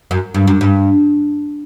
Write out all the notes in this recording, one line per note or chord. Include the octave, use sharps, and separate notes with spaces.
F#2
G2
F#2
G2